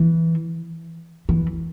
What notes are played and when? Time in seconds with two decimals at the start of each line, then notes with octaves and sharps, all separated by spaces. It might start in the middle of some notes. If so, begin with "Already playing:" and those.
Already playing: E3
1.29 E3